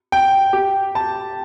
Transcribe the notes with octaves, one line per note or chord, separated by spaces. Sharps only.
G5
G4
A5